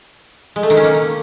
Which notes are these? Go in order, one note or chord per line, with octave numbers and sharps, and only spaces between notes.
G#3
A3
D#3
C#4
A#3